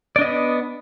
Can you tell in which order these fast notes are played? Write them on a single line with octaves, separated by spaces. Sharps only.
D5 D4 D#5 B3